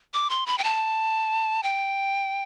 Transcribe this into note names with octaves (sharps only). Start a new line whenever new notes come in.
D6
C6
B5
G5
A5
G5